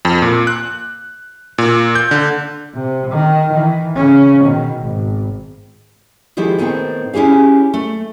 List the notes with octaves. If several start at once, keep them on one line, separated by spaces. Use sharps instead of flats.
F2
A#2
F#6
A#2
G6
D3
C3
D#3
D#3 E3
C#3 C#4
B2 D#3
G#1
D#3 F3 G#3 E4 G4 A4
A2 D#3 B3 C4 A4 G5
C#4 E4 G4 G#4 F5
A3